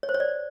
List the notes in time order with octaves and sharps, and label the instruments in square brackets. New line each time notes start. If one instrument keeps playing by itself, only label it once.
[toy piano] C#5
C5
C#5
D5